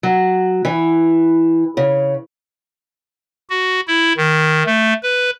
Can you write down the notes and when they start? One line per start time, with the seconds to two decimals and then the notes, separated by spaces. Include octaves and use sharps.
0.03 F#3
0.65 E3
1.77 C#3
3.50 F#4
3.88 E4
4.17 D#3
4.66 A3
5.03 B4